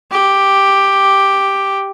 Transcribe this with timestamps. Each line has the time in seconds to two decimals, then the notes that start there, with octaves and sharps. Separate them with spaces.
0.11 G4